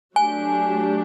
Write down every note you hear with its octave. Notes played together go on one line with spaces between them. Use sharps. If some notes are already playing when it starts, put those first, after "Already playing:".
F#3 A3 D4 G4 G#5